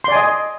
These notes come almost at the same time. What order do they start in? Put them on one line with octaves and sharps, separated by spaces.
C6 D5 G#5 D#5